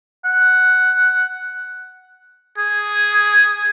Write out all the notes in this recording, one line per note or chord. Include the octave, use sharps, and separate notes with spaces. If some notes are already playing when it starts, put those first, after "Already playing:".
F#5
G#4